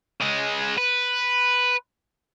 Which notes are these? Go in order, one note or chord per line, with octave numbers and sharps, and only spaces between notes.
C#3 G#3
B4